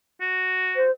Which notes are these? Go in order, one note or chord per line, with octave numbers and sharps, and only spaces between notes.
F#4
C5